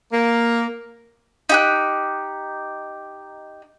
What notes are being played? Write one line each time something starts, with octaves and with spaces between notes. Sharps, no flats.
A#3
D#4 G4 F#6